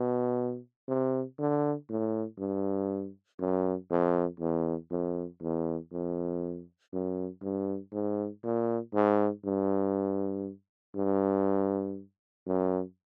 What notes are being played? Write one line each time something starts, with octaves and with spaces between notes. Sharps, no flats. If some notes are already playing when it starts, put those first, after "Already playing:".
Already playing: B2
C3
D3
A2
G2
F#2
F2
E2
F2
E2
F2
F#2
G2
G#2
A#2
G#2
G2
G2
F#2